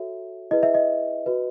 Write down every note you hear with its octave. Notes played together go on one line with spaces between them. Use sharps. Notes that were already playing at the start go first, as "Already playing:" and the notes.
Already playing: F#4 A4 C#5 E5
E4 G#4 B4 D#5
E5
D#5
F#4 B4